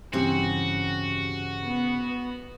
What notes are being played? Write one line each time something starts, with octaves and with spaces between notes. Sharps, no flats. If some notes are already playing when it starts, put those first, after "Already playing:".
G2 C#3 E3 C4 F#4 G4
B3